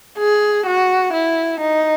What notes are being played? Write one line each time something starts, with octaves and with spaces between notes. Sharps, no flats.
G#4
F#4
E4
D#4